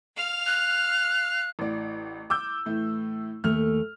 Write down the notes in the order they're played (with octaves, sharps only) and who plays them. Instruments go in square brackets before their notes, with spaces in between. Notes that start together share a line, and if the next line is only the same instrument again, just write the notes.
[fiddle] F5 F6
[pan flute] F#6
[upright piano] A1 A2 D5
D6 E6 G6
A2 E3 A3
[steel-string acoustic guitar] D#2 A3 [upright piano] F6 F7